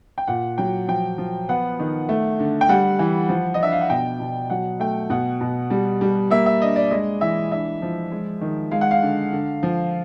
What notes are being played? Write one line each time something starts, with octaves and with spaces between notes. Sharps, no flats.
G5
A#2 F#5
F#3 G5
F3 G5
F3
B3 F#5
D#3
A3
D3
G5
G3 F#5
E3
F3
D#5
D4 E5
F5
F#5
B2 G5
B2
F#3 F#5
A3 G5
B2 F#5
B2
G3
G3
A#3 E5
E5
D4 D#5
D5
G#3 D#5
E3 E5
D4 E5
F3
G#3
D#3
G#3 F5
F#5
F5
D3
D3
F3